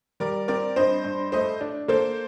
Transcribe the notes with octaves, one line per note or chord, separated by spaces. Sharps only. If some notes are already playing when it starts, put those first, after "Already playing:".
G3 A#4 D5
C4 A#4 D5
G2 C5 D#5
G2
A3 C5 D#5
D4
A#3 A4 C5